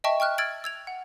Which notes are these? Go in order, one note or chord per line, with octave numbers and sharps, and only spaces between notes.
D#5 E5 G5 A5 C#6
G5 C#6 F6 F#6
E6 F6 G#6 A6 D7 F#7
E6 G#6 F7
F#5